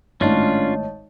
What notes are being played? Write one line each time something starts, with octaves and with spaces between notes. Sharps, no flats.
G#1 A2 C#4 D4 F4 C#5 D#5 A5